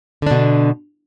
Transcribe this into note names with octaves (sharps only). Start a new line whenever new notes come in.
B2 D3 D4